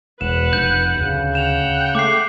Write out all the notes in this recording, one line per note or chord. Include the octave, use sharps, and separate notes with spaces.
E1 B4 F#5 E7
F1 G6
D1 C#3
F#5 G5 E7 F7
A3 D6 C7